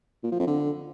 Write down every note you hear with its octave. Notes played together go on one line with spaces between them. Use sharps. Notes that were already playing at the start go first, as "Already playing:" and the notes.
A#2
F3
F2
D3